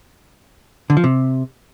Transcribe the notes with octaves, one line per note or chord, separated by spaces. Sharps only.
D3
F3
C3